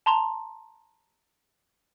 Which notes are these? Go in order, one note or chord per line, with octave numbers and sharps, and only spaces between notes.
A5 A#5 C6 F7